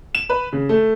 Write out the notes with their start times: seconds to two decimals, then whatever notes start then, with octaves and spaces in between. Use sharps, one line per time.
0.15 E7
0.29 B4
0.53 C#3
0.69 A3